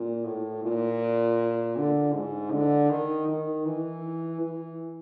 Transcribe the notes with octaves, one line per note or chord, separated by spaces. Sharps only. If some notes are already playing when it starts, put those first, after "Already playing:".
Already playing: A#2
A2
A#2
D3
G#2
D3
D#3
D#3
E3
E3